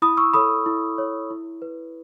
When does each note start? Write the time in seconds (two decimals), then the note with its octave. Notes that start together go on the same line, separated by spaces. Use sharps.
0.02 E4 B5 D#6
0.17 C#6 E6
0.33 A4 C#5 B5 D#6
0.66 E4
0.98 A4 C#5
1.30 E4
1.62 B4